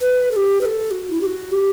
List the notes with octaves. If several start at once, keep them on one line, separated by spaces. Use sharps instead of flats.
B4
A4
G4
B4
A4
F#4
E4
G4
F#4
G4